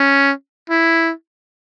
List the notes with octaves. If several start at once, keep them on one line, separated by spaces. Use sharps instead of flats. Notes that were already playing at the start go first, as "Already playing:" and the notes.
Already playing: C#4
E4